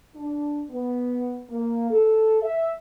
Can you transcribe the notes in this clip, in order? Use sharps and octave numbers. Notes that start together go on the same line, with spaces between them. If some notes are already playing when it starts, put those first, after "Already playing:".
D4
B3
A#3
A4
E5